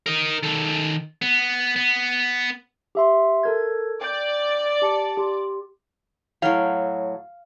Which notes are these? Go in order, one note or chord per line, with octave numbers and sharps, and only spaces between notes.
A#4 D#5
D#3 A4
B3
B3
G4 E5 C6
A4 A#4 G#6
D5 G5 G6
G4 A5 C#7
G4 C6
A2 F#3 F5